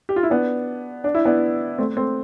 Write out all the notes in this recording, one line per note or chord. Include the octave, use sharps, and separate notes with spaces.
G4
F4
E4
B3 D4
D4
E4
B3 D4
A3 C4
A3 C4